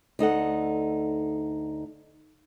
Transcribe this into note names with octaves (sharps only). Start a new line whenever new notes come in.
D2 D#4 A4 F#5